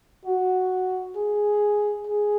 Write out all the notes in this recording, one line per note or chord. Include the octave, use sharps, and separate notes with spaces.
F#4
G#4
G#4